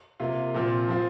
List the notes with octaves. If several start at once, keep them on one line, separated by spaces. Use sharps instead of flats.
C3 A#3 F4
A#2 F3 C4 F4
F3 C4 F4